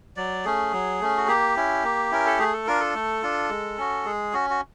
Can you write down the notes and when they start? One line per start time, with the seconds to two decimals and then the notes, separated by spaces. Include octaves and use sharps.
0.17 F#3 D5
0.45 A3 C#4 G#4
0.73 F#3
1.01 A3 C#4
1.17 F#4
1.28 A#3 G4
1.56 C#4 E4
1.84 A#3
2.11 C#4 E4 A#4
2.26 A4
2.39 A3 G#4
2.53 A4
2.67 D4 F4 A#4
2.80 A4
2.94 A3
3.22 D4 F4
3.50 G#3
3.78 C#4 F#4
4.05 G#3 G#4
4.33 C#4 F#4
4.50 F#4